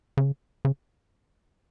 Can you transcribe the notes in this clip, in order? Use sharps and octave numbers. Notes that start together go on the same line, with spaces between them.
C#3
C#3